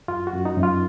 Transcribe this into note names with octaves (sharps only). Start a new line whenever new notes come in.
F#2 F4
F#4
F#2
D#4
F#2
F4